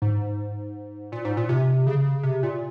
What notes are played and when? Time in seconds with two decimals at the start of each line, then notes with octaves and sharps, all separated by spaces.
0.02 G#2
1.12 A#2
1.25 G#2
1.37 A#2
1.49 C3
1.87 C#3
2.23 C3
2.43 A#2